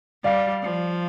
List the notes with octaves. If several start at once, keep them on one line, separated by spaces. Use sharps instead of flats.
G3 D5 F5
F3